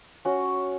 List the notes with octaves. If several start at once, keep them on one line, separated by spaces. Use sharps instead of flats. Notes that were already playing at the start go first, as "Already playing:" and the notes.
C#4 F#4